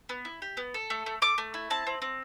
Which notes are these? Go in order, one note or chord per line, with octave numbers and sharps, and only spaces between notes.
B3
E4
G4
B3
A4
A3
A3
A3 D6
A3
E4
C4 A5
C4
C4